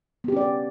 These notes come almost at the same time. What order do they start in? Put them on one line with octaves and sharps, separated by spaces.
B3 G4 C#4 D5